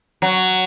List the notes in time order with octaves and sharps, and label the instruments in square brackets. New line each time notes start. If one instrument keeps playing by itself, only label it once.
[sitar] F#3